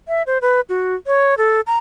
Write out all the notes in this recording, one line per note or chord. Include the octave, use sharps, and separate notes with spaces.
E5
C5
B4
F#4
C#5
A4
A#5